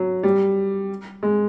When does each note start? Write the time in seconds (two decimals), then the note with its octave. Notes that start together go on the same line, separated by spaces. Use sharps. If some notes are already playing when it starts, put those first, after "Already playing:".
Already playing: F#3
0.23 G3
1.23 G#3